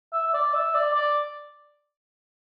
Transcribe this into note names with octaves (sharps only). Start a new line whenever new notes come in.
E5
E5
D5
E5
D5
D5